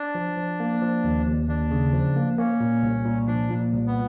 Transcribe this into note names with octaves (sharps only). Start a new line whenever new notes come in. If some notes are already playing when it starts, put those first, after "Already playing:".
Already playing: D4
F3
F3
A#3
F3
D#2
D#2
D#2 D4
C#3
F3
A#3
A#3 C#4
A#2
C2
A#2
F3 D4
A#2
C2
B3